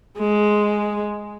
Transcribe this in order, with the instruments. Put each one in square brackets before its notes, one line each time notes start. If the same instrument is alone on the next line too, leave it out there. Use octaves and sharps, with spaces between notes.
[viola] G#3